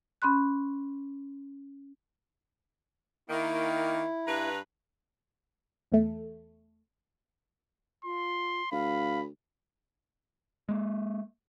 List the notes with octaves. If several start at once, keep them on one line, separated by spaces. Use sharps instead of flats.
C#4 B5 C6 F#6
D#3 A#3 E4
G2 B4 A#5
E2 A3
F4 C6
D2 F5 B5
G#3 A#3